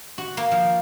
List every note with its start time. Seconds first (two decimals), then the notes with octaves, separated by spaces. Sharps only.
0.18 F#4
0.37 A#3
0.51 F3